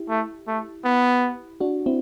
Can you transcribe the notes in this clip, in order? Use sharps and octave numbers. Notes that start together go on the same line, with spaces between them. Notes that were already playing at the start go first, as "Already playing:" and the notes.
Already playing: E4 G4
A3
A3
B3
D4 F#4
C4 E4